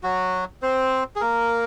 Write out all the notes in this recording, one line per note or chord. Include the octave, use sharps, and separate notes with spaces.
F#3 F#4
C4 C5
G#4
A#3 A#4